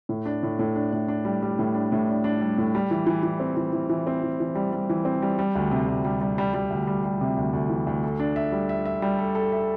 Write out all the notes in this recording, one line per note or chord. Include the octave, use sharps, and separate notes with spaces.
A2
D4
A2
A2
D4
A2
D4
G3
G3
A2
D4
A2
D4
D4
G3
A2
G3
E3
E3
E3
C4
E3
E3
E3
C4
E3
E3
G3
G3
E3
C4
G3
G3
D2
C3
D2
G3
G3
G3
G3
D2
G3
G3
C3
D2
D2
E3
D2
A4
D4
E5
G3
E5
E5
G3
A4
A4
E5